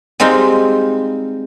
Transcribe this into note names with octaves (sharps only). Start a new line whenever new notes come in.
G3 G#3 C4 D#4 F4